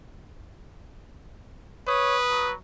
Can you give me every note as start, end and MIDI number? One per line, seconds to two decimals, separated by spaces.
1.88 2.54 71
1.88 2.16 73
1.88 2.46 87
2.30 2.54 54